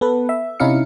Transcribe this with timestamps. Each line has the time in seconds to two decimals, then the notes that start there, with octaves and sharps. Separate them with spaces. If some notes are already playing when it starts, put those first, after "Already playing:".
0.01 B3 A4 B4
0.29 E5
0.60 C3 C#4 D#4 E4 F5 C#7